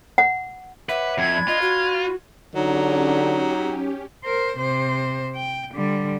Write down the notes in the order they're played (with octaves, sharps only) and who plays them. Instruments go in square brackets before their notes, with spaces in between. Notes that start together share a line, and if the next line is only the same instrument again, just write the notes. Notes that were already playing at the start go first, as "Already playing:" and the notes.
[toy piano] F#5
[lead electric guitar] B4 [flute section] C#5 F#5 D6 [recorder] E5
[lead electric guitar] F2 [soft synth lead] G#6
[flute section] D4 B5
[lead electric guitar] F4 [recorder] D#5
[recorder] F#4
[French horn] D3 [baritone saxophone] F#3 [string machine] C#4 G4 [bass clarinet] D#4
[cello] A#4 C5
C3 C5
G5
D3 G3